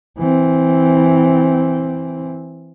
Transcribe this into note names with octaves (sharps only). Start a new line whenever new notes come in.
E3 C4